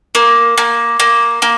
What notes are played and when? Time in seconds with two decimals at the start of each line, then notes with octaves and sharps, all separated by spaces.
0.15 A#3
0.58 A#3
1.00 A#3
1.42 A#3